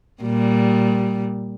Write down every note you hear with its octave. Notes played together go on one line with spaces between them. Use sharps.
A#2 G3